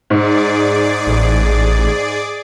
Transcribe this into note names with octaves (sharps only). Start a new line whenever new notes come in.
G#2 G#4 D5
A1